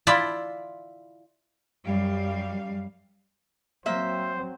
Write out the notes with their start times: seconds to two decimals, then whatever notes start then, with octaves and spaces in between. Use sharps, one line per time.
0.07 E4 F4 D5 A5 B5
1.84 F#2 G3 F5
3.86 F#3 A#3 C4 C5 E5